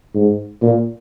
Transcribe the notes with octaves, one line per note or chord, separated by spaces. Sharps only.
G#2
A#2